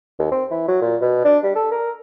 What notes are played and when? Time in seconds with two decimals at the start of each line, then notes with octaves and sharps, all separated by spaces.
0.19 D#2
0.31 C4
0.51 E3
0.68 F#3
0.81 A#2
1.01 B2
1.25 D4
1.43 G3
1.55 A4
1.71 A#4